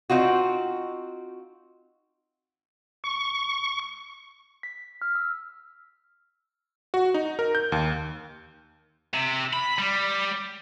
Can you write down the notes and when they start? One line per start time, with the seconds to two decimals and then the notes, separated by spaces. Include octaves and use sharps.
0.10 C4 D#4 F4 F#4
3.04 C#6
4.63 B6
5.02 F6
5.15 E6
6.94 F#4
7.14 D#4
7.39 A#4
7.55 G6
7.72 D#2
9.14 C3
9.53 B5
9.79 G3